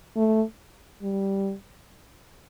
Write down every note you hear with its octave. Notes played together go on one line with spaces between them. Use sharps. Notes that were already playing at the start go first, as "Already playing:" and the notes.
A3
G3